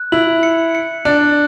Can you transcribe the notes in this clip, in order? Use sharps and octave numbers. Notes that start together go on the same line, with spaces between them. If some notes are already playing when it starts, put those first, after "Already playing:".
Already playing: F#6
E4 F#7
C#7
C#7
D4 F#6